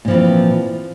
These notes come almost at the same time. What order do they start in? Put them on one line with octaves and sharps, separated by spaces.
A#2 F3 E3 C4